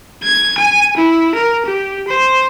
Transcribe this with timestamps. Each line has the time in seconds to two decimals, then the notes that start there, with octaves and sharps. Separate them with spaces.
0.23 G#6
0.58 G#5
0.97 E4
1.35 A#4
1.66 G4
2.08 C5